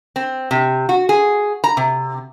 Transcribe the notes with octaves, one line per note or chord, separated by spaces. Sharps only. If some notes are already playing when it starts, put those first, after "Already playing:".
C4
C3
F#4
G#4
A#5
C3